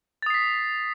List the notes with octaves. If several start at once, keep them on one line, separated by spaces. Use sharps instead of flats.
D#6 A6 B6 C7